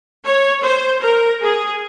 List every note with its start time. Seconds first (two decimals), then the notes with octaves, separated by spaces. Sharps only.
0.24 C#5
0.63 C5
1.01 A#4
1.41 G#4